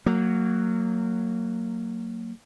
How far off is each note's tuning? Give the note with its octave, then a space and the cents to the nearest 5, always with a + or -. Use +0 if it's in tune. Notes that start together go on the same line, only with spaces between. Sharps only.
F#3 +0 A#3 -25